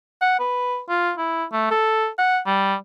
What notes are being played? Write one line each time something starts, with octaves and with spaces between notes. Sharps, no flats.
F#5
B4
F4
E4
A3
A4
F#5
G3